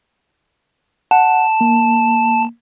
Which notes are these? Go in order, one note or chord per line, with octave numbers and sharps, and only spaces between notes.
F#5 A5
A#3